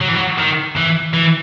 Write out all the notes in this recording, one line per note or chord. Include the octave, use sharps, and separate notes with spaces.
F#3
E3
F#3
D#3
E3
E3